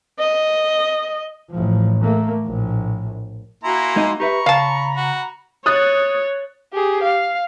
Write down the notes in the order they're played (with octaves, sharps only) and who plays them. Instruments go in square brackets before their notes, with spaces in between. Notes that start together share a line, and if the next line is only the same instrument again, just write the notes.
[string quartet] D#5
[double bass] A1 F3
A3 A#3
A#1 A2
[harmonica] A#3 E4 A#5 [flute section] F#4 G#5 C6
[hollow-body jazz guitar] G#3 D#4 D#5
[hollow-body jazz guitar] G4 B4 E5 [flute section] A#5 B5 [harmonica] C#6
[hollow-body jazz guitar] C#3 [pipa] F5 A5
[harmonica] F#4
[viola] C#5 [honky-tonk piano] D#6 F#6 A6
[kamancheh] G4 G#4
F5